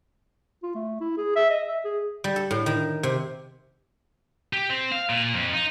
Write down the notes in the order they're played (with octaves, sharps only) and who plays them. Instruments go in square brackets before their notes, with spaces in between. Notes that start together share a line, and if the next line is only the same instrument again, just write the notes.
[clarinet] F4
A3
E4
G#4
E5
D#5
E5
G#4
[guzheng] G3
A4
A2
D#3
C3
[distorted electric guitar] G4
C4
F5
A#2
F2
D#4